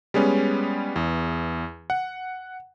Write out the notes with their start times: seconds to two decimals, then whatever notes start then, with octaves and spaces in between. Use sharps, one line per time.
0.14 G3 G#3 B3 C#4
0.96 E2
1.90 F#5